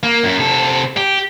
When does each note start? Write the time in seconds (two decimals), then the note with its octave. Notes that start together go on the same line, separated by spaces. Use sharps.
0.03 A#3
0.23 F#2
0.39 C3 A4
0.97 G4